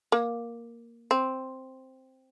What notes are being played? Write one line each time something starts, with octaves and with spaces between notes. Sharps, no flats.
A#3
C4